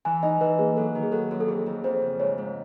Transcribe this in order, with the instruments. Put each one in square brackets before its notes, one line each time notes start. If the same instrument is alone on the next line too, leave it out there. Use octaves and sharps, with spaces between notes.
[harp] E3 [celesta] G#5
[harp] D#4 [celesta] D#5
[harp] E3 [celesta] B4
[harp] A#3 [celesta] G#4
[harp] F#3 [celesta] A4
[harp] D#3
[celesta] G#4
[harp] F#3 [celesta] A4
[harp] F#2
[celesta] A4
[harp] F2 [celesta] G#4
[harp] F2
[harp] F2 [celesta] C5
[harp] C#3
[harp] G#2 [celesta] C#5
[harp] G#2